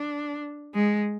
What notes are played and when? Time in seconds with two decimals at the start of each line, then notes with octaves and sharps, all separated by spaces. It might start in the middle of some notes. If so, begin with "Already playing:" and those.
Already playing: D4
0.75 G#3